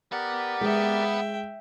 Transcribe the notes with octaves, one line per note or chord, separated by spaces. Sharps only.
B3 G4 A#4 D5 F#5
G#3 E5 G5